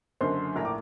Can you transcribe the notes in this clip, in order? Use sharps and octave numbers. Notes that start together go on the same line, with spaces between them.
F#1 F#2 D3 C5 C6
A#1 A2 A#4 A#5
D6